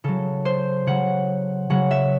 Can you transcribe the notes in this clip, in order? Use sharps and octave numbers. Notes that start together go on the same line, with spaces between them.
C#3 F#3 A4
C5
C#3 F#3 F#5
C#3 F#3 F#5
E5